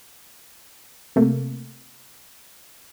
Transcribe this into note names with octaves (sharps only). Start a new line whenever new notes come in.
C3 A3 A#3